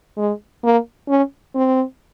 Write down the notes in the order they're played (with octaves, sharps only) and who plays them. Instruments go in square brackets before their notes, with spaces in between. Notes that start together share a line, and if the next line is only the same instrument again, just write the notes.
[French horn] G#3
A#3
C#4
C4